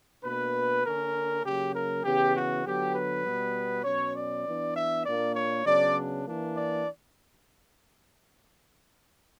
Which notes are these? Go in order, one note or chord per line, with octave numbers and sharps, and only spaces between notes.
B2 A#3 D4 B4
D3 A#3 C#4 A#4
C#3 F#3 A#3 G4
A#4
C#3 E3 B3 G4
F#4
D3 F#3 B3 G4
B4
B2 G3 B3
B2 F#3 C#4 C#5
D5
E3 B3 D4
E5
A#2 A#3 D4 D5
C#5
C#3 F#3 B3 D4 D5
E3 A#3 D4
D5